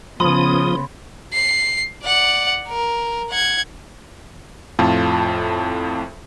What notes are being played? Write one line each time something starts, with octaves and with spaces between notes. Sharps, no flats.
C#3 F3 B3 B5 C6 D#6
C7
D5 F#5
A#4
F#5 G#6
F2 A2 F4 A5